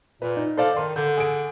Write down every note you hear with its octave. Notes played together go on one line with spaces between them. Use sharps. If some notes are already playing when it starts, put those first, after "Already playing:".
A#2 B4
D#4
A4 C5 D5 F5
D#3 C6
D3 G6
G#4 D7